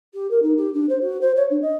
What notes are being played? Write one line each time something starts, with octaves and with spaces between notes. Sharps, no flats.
G4
A#4
D#4
G4
D4
C5
F#4
C5
C#5
D4
D#5